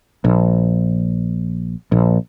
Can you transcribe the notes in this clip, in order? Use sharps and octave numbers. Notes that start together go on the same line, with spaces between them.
A#1
A#1